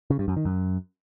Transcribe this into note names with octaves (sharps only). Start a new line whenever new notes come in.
C#3
G2
F#2
D#3
F#2